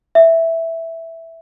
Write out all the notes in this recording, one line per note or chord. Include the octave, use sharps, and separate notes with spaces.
E5